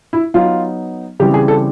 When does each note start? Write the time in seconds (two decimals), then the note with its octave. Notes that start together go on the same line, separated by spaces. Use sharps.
0.13 E4
0.34 F#3 B3 D#4 F4
1.20 C#3 E3 G3 C4 G4
1.34 G#4
1.48 A4